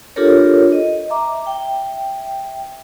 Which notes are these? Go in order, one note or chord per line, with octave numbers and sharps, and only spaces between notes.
D4 F4 G4 A4 A#4 C#5
D#5
E5 A#5 D6
E5 G5